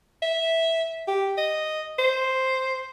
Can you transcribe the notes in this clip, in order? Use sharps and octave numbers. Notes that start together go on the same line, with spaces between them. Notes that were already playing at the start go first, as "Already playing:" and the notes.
E5
G4
D#5
C5